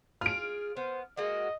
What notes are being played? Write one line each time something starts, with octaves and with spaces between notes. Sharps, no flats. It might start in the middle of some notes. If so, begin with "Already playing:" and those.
F4 G#4 F6 D7
B3 C5
G#3 A#3 F#4 D#5